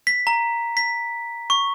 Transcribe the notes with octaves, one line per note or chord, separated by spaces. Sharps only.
B6
A#5
B6
C#6